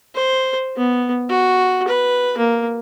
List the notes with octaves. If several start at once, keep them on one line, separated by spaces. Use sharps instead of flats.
C5
B3
F#4
B4
A#3